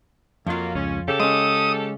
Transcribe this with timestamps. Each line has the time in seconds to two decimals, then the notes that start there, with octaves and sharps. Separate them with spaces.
0.47 F2 F#3 A#3 F4
0.75 C#2 C#4
1.08 C#3 G4 A4
1.20 G#3 C#4 D#6